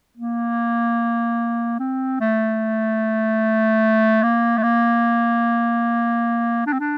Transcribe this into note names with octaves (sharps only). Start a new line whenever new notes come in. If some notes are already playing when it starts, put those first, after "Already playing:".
A#3
C4
A3
A#3
A3
A#3
D4
C4
D4